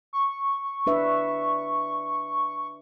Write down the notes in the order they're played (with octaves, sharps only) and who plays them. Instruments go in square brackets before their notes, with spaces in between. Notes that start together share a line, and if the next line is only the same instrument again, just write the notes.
[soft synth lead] C#6
[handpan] D4 B4 E5